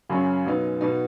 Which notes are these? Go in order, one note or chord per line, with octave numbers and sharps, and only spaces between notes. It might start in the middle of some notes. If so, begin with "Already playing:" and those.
F#2 C#3 F#3 C#4
B2 F#3 B3 D#4
B2 B3 D#4